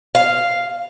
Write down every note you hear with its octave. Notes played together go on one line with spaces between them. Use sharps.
F5